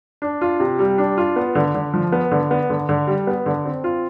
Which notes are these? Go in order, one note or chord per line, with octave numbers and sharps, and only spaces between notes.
D4
F4
C3
G3
D4
F4
B3
D3
D3
F3
B3
D3
B3
D3
D3
G3
B3
D3
C4
F4